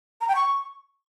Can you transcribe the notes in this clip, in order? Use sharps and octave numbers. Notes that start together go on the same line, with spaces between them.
A#5
G5
C#6